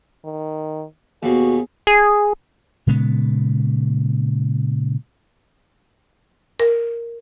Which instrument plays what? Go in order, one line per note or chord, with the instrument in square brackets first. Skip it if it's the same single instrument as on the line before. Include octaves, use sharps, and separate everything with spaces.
[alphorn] D#3
[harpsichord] D#2 B2 [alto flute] F#4 [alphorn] G#4
[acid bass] G#4
[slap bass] A#2 C#3 G#3 B3
[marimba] A#4